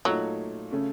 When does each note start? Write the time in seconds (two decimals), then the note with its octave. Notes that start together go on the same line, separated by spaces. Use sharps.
0.05 A#2 F#3 A3 D#4
0.71 C#3 A3 C#4